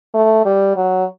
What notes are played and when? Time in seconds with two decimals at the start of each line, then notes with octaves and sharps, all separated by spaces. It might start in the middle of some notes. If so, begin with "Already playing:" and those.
0.14 A3
0.45 G3
0.77 F#3